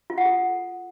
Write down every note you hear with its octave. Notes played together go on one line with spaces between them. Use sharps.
F4
F#5
A4